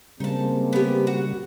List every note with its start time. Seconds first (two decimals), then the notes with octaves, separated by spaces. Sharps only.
0.20 C#3 G3 G#3 A#3 C4 D#4 A5
0.73 B3 G4
1.07 F#4